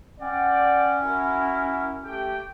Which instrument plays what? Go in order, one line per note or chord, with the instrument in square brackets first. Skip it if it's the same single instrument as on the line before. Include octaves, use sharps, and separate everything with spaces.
[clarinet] C#4 [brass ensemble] D5 F#5 G5
[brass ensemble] E4 F#4 A#4
A3 G4 G5